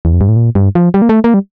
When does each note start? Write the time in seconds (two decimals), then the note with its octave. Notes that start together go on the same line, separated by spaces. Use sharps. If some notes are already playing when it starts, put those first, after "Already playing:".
0.05 E2
0.13 F2
0.21 G2
0.28 A2
0.36 A#2
0.55 G2
0.75 F3
0.94 G3
1.02 A#3
1.09 A3
1.24 A#3
1.34 G3